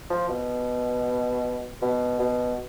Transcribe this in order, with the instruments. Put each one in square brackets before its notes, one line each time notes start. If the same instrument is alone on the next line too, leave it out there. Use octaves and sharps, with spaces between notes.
[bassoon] F3
B2
B2
B2